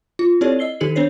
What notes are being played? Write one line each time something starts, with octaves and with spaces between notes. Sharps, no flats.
F4
C4 E4 G4 A4 C#5 D5
D#5 E6 C7 G7
D#3 D#4 G4 A4 C#7 F#7
B3 D4 C5 C#5 C7